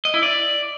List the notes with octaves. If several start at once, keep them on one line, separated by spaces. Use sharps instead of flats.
D#5
E4
D5